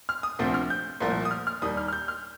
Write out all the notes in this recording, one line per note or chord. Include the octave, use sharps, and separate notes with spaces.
F6
D#6
D2 C3 F3 A3 C4
F6
G6
C2 A#2 F3 A3
D#6
F6
F6
D#2 D#3 G3 D#6
F6
F6
G6
F6